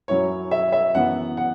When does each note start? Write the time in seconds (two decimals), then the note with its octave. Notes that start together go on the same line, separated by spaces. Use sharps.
0.08 F#2 F#3 C#4 E4 C#5
0.51 E5
0.72 E5
0.94 F#2 E3 B3 F#5
1.37 F#5